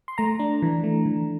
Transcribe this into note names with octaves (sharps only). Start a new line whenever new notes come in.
C6
A3 A#5
D4
E3
A3
E3